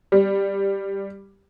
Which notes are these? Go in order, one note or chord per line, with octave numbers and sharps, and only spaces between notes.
G3